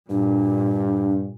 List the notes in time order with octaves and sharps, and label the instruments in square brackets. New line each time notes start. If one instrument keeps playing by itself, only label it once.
[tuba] G2 [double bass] A#2 [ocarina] D4